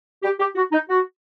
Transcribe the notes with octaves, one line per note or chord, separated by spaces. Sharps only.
G4
G4
F#4
D#4
F#4